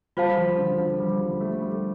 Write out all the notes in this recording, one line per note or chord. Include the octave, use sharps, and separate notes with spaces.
G3 F4 C5 F5 A5
F3
D3
F3
G3
G3
A3
G3